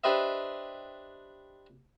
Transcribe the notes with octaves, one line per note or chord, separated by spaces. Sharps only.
D4 G4 B4 C5 D#5 E5